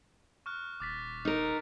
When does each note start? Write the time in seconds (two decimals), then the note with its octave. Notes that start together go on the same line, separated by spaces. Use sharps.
0.46 C#6 F6 F#6
0.80 D#1 D6 A6 B6
1.25 D#4 A#4 F6